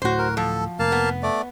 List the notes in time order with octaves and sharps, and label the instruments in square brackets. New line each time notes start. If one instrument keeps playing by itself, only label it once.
[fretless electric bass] D1 A2 [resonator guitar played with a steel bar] F#4 C5
[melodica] A#4
[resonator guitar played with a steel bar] F3 [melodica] A4
[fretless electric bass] F1 [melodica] A#3 F5 A5
[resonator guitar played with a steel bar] B3
[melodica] A3 D5